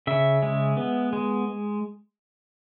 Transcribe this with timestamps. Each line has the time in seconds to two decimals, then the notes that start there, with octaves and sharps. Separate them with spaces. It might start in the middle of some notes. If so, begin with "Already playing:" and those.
0.07 C#3 E5
0.43 G#3
0.77 B3
1.13 G#3